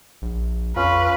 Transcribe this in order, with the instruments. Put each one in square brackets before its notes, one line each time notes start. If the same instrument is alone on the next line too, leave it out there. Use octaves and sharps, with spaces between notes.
[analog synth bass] A#1
[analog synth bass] F2 [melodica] C#4 [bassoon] F4 [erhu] B4